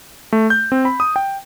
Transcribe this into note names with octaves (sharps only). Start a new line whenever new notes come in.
A3
G6
C4
B5
D#6
G5